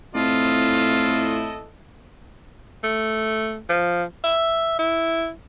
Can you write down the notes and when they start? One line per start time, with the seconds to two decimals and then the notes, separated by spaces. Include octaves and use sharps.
0.15 A2 C4 E4 F4 A4 D#5
2.84 A3
3.69 F3
4.24 E5
4.79 E4